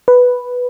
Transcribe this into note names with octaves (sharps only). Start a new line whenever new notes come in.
B4